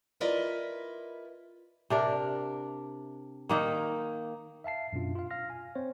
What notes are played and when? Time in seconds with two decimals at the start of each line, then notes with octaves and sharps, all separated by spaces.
0.20 E4 F4 A#4 B4 D5 D#5
1.90 C3 D4 A#4
3.49 D#3 A#3 D#4
4.64 E5 F5 A5 C7
4.93 F#2 B2 D4 F4
5.15 F4 F5
5.31 F5 F6 A#6
5.50 G#5
5.75 C4 C5 C#5